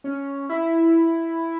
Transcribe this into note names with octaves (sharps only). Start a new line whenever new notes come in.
C#4
E4